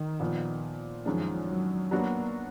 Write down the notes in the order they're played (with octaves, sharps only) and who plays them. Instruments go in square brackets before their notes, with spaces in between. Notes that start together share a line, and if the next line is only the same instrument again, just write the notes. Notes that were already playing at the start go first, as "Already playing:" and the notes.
Already playing: [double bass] D#3
[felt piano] A#2 F3 B3
[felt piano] F#2 D#3 G#3 D4 [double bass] F3
[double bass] F#3
[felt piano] F#3 B3 D4 F#4 [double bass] A#3